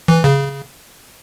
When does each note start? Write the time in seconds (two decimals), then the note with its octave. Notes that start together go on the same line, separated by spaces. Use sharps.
0.08 E3
0.24 C#3